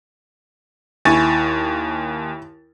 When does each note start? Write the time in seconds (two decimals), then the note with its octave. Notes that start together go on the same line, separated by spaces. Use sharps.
1.05 D#2 E4 G#5 C#6 A6